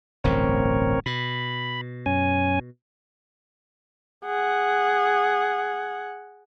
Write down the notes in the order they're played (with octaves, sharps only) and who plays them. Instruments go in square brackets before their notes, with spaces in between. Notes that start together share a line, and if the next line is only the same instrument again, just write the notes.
[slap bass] D1 A1 G2 [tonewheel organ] C4 A#4 C#5
[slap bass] B2 [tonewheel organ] B5
[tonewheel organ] F#2 C#4 G#5
[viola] G#4 F#5